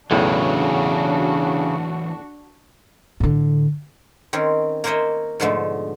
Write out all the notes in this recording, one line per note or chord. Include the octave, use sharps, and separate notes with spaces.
B1 E2 A2 C#3 E3 F#3 D4 F#4
A2 D3
D#3 C4 C#4
A#3 A#4 C5 C#5 D#5 E5
G#2 B2 D3 F3 A3